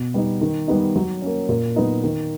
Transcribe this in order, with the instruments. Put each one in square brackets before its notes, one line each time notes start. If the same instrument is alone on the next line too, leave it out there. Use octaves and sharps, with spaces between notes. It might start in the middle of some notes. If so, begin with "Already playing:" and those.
Already playing: [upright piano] B2
G3 B3 D#4
D#3
G3 B3 D#4
F#3
A#3 C#4
A#2
F#3 B3 D#4
D#3